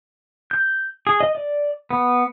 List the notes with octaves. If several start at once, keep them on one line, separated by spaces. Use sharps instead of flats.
G6
G#4
D#5
D5
B3